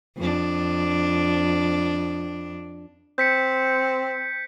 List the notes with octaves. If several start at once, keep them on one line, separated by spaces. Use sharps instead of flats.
F2 D4
C4 G6 B6 C#7